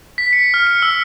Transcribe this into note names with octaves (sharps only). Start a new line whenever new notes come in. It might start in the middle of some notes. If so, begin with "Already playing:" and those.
B6
C#7
F6
C#7
E6